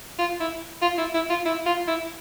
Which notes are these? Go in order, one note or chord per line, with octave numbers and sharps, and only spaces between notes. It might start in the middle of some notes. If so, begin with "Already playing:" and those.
F4
E4
F4
E4
E4
F4
E4
F4
E4